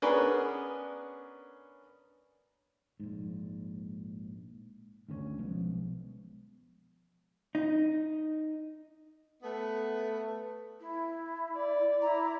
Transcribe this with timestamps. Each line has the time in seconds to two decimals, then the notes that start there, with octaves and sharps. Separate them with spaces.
0.02 B3 C#4 D4 G#4 A#4 B4
3.00 A#1 G#2
5.09 D2 D3 G3 C#4
5.39 B1 F3 G#3 B3
7.55 D#4
9.42 A3 B3
10.80 E4
11.56 D5
12.01 E4 A#5